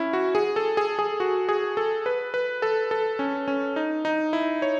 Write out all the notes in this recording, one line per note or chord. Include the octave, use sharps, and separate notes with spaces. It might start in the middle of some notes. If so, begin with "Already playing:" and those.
Already playing: C#4 E4
F#4
G#4
A4
G#4
G#4
F#4
G#4
A4
B4
B4
A4
A4
C#4
C#4
D#4
D#4
E4
C#5